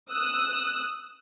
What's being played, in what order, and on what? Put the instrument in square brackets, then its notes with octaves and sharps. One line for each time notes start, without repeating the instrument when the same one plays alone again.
[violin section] D#6 E6 F#6